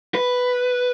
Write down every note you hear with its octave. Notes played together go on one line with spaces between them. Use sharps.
B4